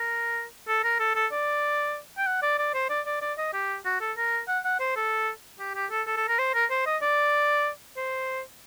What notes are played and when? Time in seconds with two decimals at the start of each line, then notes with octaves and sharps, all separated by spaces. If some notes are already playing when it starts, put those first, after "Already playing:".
Already playing: A#4
0.68 A4
0.84 A#4
1.00 A4
1.15 A4
1.32 D5
2.18 G5
2.27 F#5
2.42 D5
2.59 D5
2.74 C5
2.90 D5
3.06 D5
3.22 D5
3.38 D#5
3.53 G4
3.85 F#4
4.01 A4
4.17 A#4
4.48 F#5
4.64 F#5
4.80 C5
4.96 A4
5.59 G4
5.75 G4
5.91 A4
6.07 A4
6.17 A4
6.28 A#4
6.39 C5
6.54 A#4
6.70 C5
6.86 D#5
7.02 D5
7.97 C5